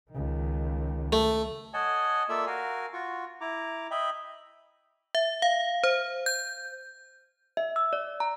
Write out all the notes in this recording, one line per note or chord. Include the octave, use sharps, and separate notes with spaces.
C#2 D#3
A3
C#5 D#5 F#5 G#5 A5
A#3 F4 A4 D5 E5 E6
F#4 A#4 F5 G#5
F4 F#4 C#6
E4 A#5 D6
D#5 E5 G5 B5
E5
F5
C5
G6
E5
E6
D5
A#5